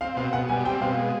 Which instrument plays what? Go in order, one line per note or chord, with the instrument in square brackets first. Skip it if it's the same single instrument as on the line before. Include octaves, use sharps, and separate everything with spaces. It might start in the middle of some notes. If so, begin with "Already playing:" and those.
[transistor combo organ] C4 [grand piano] F5
[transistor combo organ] B2 [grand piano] F5
[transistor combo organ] B2 [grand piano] F#5
[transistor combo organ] G3 [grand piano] G#5
[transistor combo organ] C4 [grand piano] G5
[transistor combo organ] B2 [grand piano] F5
[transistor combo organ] G#3